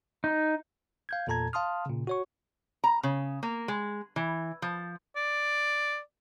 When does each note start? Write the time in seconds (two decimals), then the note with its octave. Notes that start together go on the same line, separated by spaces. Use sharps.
0.24 D#4
1.09 F5 G6 G#6
1.27 E2 A#2 A4 A5 A#5 G#6
1.53 F5 A5 C6 D#6 F6
1.86 A#2 C#3
2.07 F#4 C#5 C#6
2.84 A#5
3.03 C#3
3.43 A#3
3.68 G#3
4.16 E3
4.62 F3
5.16 D5